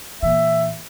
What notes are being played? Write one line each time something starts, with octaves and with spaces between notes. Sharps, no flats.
A#2 E3 E5